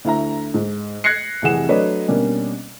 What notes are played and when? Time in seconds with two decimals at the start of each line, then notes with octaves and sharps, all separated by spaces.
0.05 D2 E4 E5 A#5
0.54 G#2
1.04 F#6 G#6 A#6 C7 C#7
1.42 F1 C2 E3 G#4 F#5 E7
1.69 F#3 A3 D4 B4 C#5 D#5
2.08 B2 G3 A#3 C#4 D4